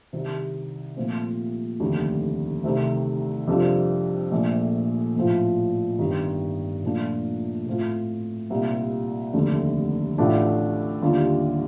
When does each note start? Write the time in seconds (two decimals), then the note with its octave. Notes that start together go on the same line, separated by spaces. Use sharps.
0.13 C2 C3 D#3
0.97 A#2 F3 A3 C4 F4
1.80 F1 D#2 D3 A3
2.63 C2 C3 D#3 A3
3.47 F2 C3 G3 D4 F4
4.32 A#1 A#2 A3
5.16 A#1 A2 F3
5.99 G1 G2 D#3 G3
6.82 A#2 F3 A3 D4 F4
7.66 A2 A3 C4 F4
8.50 C2 A#2 G3 A#3 D#4
9.34 F1 D#2 D3 A3
10.18 A1 A2 A3 D4 F4
11.02 D#2 D3 G3 D4 F4